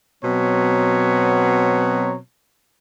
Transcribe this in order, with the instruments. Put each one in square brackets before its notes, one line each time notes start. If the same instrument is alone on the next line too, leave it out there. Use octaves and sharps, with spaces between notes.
[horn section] B2 F#3 B3 C4 C#5 A#5